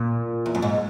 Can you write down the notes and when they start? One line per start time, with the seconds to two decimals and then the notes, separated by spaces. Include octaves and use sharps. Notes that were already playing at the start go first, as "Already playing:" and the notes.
Already playing: A#2
0.46 E2
0.55 F#2
0.62 G#2